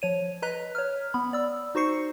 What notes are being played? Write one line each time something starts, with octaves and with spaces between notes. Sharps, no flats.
F3 C#5 D#7
B4 D#5 A#5 F#6 B6
C#5 F6
B3 B5
D5 E6
D#4 F#4 C5 C#6 C7 C#7